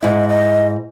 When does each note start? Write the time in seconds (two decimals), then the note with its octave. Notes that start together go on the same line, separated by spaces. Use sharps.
0.03 G#2 E4 D#5
0.29 D#5